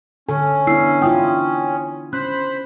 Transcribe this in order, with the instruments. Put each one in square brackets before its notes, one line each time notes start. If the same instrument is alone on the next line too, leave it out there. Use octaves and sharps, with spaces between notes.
[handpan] D3 A4 [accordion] C#4 [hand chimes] G#5
[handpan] B3 E4 [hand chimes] D4 E6 C7
[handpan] D4 E4 F4 [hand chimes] G5 D#6
[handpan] C#4 [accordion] C5 B5 [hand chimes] F#6